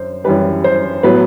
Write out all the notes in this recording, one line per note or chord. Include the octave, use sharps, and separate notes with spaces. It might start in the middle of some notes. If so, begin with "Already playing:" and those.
Already playing: F#2 C5
F#2 E3 G3 B4
C5
A2 F#3 B3 B4